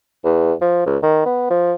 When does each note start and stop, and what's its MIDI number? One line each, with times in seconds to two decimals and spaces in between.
0.24 0.53 40
0.61 0.83 53
0.87 0.98 37
1.03 1.22 51
1.26 1.46 59
1.50 1.74 53